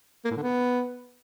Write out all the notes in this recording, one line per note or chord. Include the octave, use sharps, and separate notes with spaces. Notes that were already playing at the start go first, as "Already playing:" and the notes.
A#3
A2
D3
B3